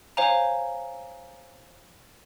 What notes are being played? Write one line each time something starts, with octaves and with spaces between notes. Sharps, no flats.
C5 C#5 F5 G#5 A#5